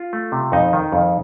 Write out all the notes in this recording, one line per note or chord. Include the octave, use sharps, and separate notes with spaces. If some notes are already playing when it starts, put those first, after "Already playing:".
Already playing: F4
A3
C3
F2 D#4
D#3
F2